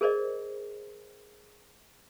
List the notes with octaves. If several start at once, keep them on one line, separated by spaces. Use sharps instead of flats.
G#4 A#4 C5 D5 D#5